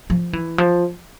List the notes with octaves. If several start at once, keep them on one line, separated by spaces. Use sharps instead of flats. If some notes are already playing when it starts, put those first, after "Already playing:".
F3
E3
F3